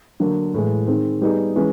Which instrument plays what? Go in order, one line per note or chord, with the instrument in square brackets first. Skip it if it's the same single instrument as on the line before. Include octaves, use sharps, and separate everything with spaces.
[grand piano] D3 F#3 A#3
A2 E3 G#3
D#3 G#3 C4
G3 B3 D#4 G#4
E3 G#3 C#4